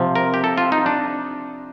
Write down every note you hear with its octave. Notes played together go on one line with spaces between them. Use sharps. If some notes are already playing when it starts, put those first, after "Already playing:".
Already playing: C3 F3
A#4
G4
A4
F4
D#4
D4